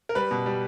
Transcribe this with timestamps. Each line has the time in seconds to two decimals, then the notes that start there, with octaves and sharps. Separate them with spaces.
0.09 A#4
0.15 G3 B4
0.31 B2
0.46 G3